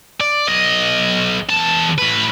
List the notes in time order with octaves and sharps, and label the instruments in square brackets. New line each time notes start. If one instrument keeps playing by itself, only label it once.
[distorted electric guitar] D5
B1 D#5
E2 A5
A2 B4